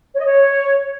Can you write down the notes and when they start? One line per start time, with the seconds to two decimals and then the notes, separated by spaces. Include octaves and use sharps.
0.13 C#5
0.19 D#5
0.24 C#5